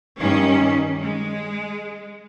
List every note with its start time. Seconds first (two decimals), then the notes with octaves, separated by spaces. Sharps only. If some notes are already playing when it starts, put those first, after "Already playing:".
0.17 G2 D#3 G3 C#4
1.01 G#3